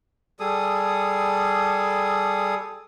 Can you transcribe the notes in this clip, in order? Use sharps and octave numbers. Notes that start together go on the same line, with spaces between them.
G3 G#4 A4 D#6